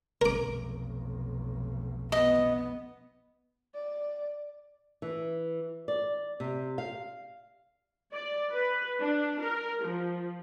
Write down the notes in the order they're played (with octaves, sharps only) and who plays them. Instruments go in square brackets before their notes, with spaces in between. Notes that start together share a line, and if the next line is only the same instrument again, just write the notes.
[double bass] F1 B1 [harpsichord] A#4 D6
[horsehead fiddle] B3 [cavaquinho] D#5
[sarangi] D5
[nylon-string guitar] E3
D5
C3
F5
[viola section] D5
B4
D4
A#4
F3